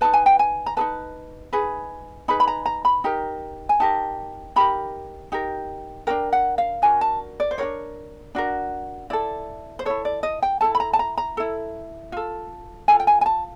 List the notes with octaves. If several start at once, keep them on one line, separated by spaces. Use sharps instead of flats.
D#4 G#4 B4 A5
G#5
G5
G#5
A#5
D#4 G#4 B4 A5
D#4 G#4 B4
D#4 G#4 B4 B5
B5
A#5
A#5
B5
D#4 G4 A#4 A#5
G#5
D#4 G4 A#4 A5
D#4 G4 A#4 B5
D#4 G4 A#4
D4 F#4 A#4 G5
F#5
F5
D4 F#4 A#4 G#5
A5
D5
C5
D4 F#4 A#4 C#5
D4 F#4 A#4
E4 A4 D5
C5
E4 A4 C#5
D5
D#5
G5
E4 A4 A5
B5
A#5
A5
A#5
A#5
E4 A4
F4 A4
F4 A4 G#5
G5
G#5
G#5
A5